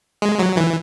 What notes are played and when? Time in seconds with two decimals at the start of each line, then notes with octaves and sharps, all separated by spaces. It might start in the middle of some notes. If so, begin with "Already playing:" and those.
0.22 G#3
0.39 F#3
0.57 E3